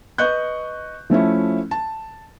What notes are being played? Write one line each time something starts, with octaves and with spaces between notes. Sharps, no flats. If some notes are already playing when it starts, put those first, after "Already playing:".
B4 D#5 C#6 F#6 G6
F3 A3 C#4 E4
A5